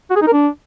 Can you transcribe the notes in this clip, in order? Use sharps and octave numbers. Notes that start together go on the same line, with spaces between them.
F#4
G#4
D#4
A#4
D4